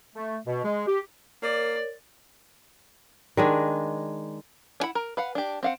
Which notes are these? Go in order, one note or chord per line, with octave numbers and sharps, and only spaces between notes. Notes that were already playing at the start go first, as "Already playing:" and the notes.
A3
B2
G#3
G4
A#3 A#4 C#5 D5
D#3 G#3 D4
D4 E4 F#5 B5
A#4
B4 F5 F#5
D4 G4
C4 F5 F#5